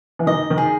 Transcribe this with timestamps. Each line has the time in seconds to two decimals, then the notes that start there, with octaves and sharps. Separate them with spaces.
0.19 E3
0.27 D#3 D#5
0.50 D#3
0.58 G#4